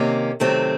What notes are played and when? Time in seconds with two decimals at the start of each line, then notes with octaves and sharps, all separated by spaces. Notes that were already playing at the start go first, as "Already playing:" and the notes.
Already playing: C3 D#3 A#3 C#4
0.40 C3 D#3 F#3 A3 C4